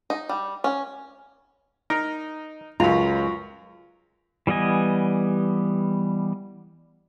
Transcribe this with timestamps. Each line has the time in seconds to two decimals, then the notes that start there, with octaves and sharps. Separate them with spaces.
0.10 D#4
0.29 G3
0.64 C#4
1.90 D#4 A#4
2.80 C#2 F#2 F4 F#4 A#5
4.47 E3 G3 B3 D#5 G#5